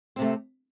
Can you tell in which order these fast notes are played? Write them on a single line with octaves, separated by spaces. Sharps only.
C4 C3 A3